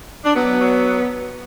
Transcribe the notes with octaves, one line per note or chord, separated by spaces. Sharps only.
D4
F#3 B3
F#3